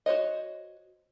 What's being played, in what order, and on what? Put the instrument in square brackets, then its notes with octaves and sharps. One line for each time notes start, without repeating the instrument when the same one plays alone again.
[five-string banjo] F#4 C5 C#5 D#5